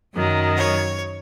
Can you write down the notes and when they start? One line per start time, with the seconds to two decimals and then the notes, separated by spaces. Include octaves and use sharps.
0.15 F#2 D#3 F#3
0.55 C#5